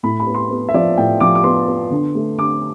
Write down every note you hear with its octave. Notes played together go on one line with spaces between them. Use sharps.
A2 B5
B5
B3
C6
B3
E5
F3 D5
A2 G5
F3 D6
D6
B3 C6
B3
D3
A3
D3 D6